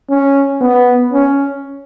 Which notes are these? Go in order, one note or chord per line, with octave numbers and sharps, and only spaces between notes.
C#4
B3
C#4